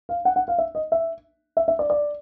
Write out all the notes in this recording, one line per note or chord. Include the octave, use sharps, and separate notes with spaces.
F5
F#5
F#5
F5
E5
D#5
E5
E5
E5
D5
D5